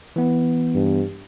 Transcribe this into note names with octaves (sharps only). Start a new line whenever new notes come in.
E3 B3
G2